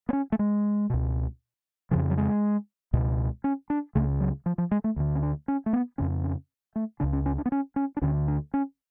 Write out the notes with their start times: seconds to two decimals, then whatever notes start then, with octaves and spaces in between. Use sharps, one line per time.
0.09 B3
0.13 C#4
0.32 A3
0.39 G#3
0.90 C#2 B2
1.91 F2 C#3 F3
2.10 F#3
2.18 G#3
2.93 C#2 B2
3.44 C#4
3.70 D4
3.95 C#2 C#3 A3
4.20 F#3
4.46 F3
4.58 F3
4.71 G#3
4.84 A3
4.96 D2 D3
5.15 C#4
5.23 D4
5.48 C#4
5.66 A3
5.73 B3
5.98 F2 C#3 C#4
6.24 C#4
6.76 A3
7.00 C#2 C#3 D4
7.13 C#4
7.26 C#4
7.38 D4
7.46 B3
7.52 C#4
7.76 C#4
7.97 D4
8.02 D2 D3 C#4
8.28 D4
8.54 C#4